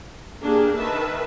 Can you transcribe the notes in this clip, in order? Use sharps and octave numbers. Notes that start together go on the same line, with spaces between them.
A#3 D4 G4 G#4
D#3 B4 E5 A5